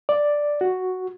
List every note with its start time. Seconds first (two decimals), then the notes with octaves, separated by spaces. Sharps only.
0.09 D5
0.61 F#4